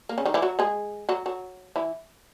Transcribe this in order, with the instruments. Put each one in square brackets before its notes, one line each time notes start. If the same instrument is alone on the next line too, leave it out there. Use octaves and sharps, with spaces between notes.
[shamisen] A#3
C#3 C#4
D#3 D#4
E3 E4
F#3 F#4
G#3 G#4
F#3 F#4
F#3 F#4
E3 E4